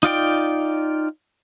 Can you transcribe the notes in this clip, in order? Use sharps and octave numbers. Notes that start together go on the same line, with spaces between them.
D#4 F4 D5 G5